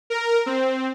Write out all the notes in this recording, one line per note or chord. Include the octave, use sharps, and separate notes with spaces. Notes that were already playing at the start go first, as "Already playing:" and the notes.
A#4
C4